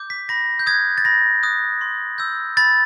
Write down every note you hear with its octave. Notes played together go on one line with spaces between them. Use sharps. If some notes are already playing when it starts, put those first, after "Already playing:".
Already playing: D6 G6
B6
B5 A#6
G6
D#6 F#6 G#6
A6
B5 A#6
D#6 F#6
C6
E6 G6
B5 A6